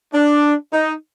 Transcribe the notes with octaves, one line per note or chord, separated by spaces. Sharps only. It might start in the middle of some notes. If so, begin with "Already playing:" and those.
D4
D#4